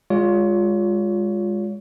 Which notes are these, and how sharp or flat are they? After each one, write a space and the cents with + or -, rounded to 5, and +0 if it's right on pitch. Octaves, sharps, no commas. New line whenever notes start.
G#3 -25 F4 +15 C#5 +30